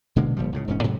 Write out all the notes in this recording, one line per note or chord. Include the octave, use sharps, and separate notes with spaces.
B2 D3 G#3 A#3
G1 A#2 F3 G3
C#2 A2 C#3
E1 G#2 C#4
G#2 C3 F#3